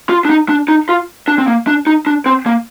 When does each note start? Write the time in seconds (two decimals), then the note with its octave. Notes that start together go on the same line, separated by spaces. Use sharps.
0.09 F4
0.25 D4
0.30 D#4
0.49 D4
0.68 D#4
0.89 F4
1.28 D4
1.38 C4
1.47 A#3
1.67 D4
1.87 D#4
2.07 D4
2.26 C4
2.46 A#3